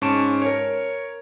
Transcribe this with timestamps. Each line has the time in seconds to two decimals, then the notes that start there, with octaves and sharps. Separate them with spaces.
0.02 G#2 C#4 A5 C#6 D7 E7
0.42 A#4 C#5